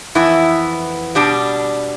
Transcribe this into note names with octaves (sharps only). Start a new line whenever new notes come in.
F2 E3 B3 E4
B2 G3 D4